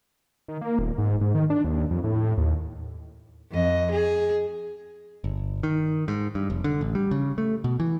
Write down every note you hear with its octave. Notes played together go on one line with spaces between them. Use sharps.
D#3
A#3
D#1
G#2
G#2
D#3
D4
D#2
F2
A2
D#2
F2 D#5
G#4
G1
D#3
G#2
G2
F1
D3
A1
G3
C#3
A3
B2
E3